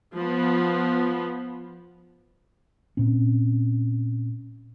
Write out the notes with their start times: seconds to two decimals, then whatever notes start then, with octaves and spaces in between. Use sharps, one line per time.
0.15 F3 B3
2.97 A#2 C4 C#4